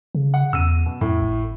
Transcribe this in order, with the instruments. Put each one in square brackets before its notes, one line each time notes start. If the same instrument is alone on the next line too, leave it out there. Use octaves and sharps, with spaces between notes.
[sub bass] C#3
[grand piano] F#5
[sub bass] E2 [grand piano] E6 D#7
[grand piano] B2
[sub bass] F2 [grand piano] A2
[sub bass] G#1